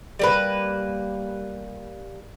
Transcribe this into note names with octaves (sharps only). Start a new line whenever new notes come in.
G3 A#3 B4